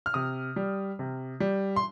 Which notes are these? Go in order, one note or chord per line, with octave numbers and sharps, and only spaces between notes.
F6
C3 D#6
G3
C3
G3
C6